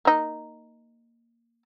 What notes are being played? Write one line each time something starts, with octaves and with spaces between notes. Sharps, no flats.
A#3 D#4